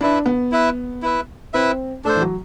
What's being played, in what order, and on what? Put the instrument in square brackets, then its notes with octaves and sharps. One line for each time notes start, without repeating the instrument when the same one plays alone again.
[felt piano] D4 [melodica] E4 B4 E5
[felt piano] B3
[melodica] E4 B4 E5
E4 B4 E5
[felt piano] C4 [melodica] E4 B4 E5
[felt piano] A3 [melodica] D4 A4 C5
[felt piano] E3
F#3